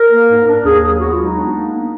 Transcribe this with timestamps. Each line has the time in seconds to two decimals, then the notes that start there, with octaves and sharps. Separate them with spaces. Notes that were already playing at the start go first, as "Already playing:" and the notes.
Already playing: A#4
0.11 A#3
0.29 G#2
0.46 D4
0.64 D#2 G#4
0.82 F#3 G#4
1.00 B3 F#4
1.12 F4
1.18 G#3
1.24 D#4
1.36 D4
1.54 A#3
1.72 B3